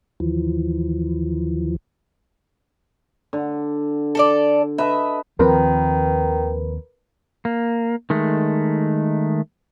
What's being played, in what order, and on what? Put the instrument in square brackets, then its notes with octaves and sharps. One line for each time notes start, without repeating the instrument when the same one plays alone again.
[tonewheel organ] D#2 E3 F3
[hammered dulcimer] D3
[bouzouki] A4 A#4 D5
[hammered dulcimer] B4 D#5 A5 [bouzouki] E5
[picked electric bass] D#2 F3 C4 [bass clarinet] D#3 [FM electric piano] A#4 B4
[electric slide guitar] A#3
D#3 G#3 A3